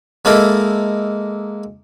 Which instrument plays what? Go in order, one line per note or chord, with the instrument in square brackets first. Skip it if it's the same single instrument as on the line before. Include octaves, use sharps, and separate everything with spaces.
[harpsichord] G#3 A#3 D#4 E4 A4 A#4